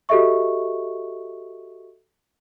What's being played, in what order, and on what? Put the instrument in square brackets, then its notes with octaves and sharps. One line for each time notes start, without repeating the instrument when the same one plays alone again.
[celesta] F#4 G4 A4 D#5 E5 C#6